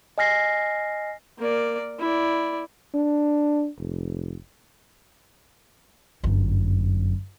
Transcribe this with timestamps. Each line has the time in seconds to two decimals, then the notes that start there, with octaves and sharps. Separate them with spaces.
0.18 D#5 G#5 F6 A#6 C7
1.38 A#3 D5
1.99 E4 D5
2.94 D4
3.78 F1
6.23 G1 F#2